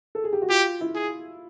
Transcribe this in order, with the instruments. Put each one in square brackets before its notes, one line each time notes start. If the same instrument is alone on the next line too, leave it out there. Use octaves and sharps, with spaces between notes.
[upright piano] A4
G#4
G4
F#4
[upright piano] F4 [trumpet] G4
[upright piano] E4
[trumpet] G#4